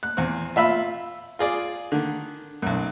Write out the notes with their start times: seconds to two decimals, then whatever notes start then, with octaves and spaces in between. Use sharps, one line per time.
0.03 F#6
0.17 E2 C4
0.56 F4 E5 B5 E6
1.39 F4 G#4 D5
1.92 D3 D#3
2.62 B1 F#2